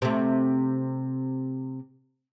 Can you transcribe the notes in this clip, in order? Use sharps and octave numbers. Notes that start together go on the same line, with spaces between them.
C3 A3